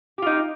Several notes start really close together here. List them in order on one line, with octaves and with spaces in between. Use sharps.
G4 F4 D#4